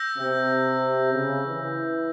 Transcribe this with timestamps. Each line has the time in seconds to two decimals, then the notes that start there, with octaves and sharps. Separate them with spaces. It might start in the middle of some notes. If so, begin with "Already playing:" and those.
Already playing: E6 G6 A#6
0.17 C3
1.13 C#3
1.46 E3